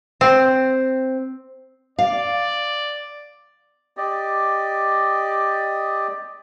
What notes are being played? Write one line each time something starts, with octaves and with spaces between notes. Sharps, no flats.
C4
D5 F5
G4 D5 D#5